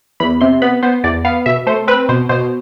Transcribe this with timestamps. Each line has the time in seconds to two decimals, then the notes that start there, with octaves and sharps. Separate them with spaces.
0.20 E2 B5
0.41 C3 C6
0.62 B3 B5
0.83 B3 C5
1.04 E2 D5
1.25 B3 F5
1.46 B2 E5
1.67 A3 C5
1.88 C4 B4
2.09 B2 C5
2.29 B2 C5